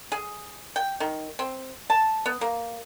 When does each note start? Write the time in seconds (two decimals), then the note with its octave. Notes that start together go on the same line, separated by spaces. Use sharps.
0.12 G#4
0.76 G5
1.00 D#3
1.39 C4
1.90 A5
2.26 B3
2.41 A#3